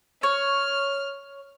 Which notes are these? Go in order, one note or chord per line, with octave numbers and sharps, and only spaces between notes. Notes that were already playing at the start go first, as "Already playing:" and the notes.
C#5 F6